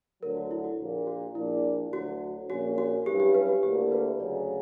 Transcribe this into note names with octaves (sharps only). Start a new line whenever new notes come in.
D2 D3 F#3 A#4
F#4
E4
F#4
A#1 A#2 A#3
F#4
A#1 A#2 A#3 D4 E4
D2 D3 F#3 F#4
A#1 A#2 A#3 C#4 F#4
F#4
G2 F#3 C#4 E4 G4
G4
B4
F#4
D2 D3 A#3 E4 G4
B4
D2 C#3 F#3 D5